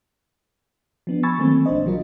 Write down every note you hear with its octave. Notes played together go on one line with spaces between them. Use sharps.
F3 B3 D4
G#5 B5 C#6 E6 G#6 A6
D#3 E3 F#3 A3 A#3 C4
A#1 D4 C5 D#5
E3 F#3 G3 F4 A#4